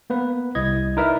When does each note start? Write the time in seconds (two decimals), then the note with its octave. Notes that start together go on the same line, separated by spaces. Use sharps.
0.10 A#3 B3 B4
0.55 C2 E4 D#5 G#6
0.97 D#4 E4 A#4 B4 D5 E5